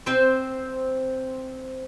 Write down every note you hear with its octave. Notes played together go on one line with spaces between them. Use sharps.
C4 C5